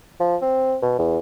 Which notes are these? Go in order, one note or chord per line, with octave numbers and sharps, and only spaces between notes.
F3
C4
B2
E2